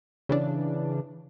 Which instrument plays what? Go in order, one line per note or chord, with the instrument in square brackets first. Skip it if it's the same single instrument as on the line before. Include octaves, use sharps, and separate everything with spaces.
[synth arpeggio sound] C#3 E3 D4